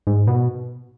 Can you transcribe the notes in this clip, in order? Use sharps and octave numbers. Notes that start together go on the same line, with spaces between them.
G#2
B2